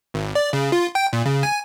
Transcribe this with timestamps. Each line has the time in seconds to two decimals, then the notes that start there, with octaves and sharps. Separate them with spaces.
0.14 G#1
0.35 D5
0.53 C#3
0.72 F4
0.95 G5
1.13 A#2
1.26 C#3
1.43 G#5